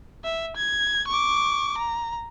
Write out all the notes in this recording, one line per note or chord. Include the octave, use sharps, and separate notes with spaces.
E5
G#6
C#6 D6
A#5